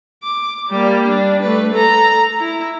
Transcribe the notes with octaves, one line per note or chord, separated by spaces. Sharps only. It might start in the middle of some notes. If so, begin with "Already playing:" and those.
D6
G3 A#3
D4
A3 B4
A4 A#5
E4